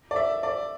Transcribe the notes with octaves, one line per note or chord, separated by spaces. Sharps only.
D5
E5
D5